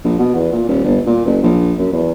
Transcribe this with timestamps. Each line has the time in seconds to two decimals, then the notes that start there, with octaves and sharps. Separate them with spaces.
0.04 A#1
0.19 B2
0.35 E2
0.53 A#2
0.68 D#1
0.84 G1
1.06 A#2
1.25 F#1
1.43 A#1
1.79 F#2
1.92 E2